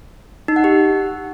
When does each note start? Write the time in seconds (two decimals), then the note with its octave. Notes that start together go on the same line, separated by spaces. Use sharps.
0.48 D#4
0.56 F#5
0.64 G4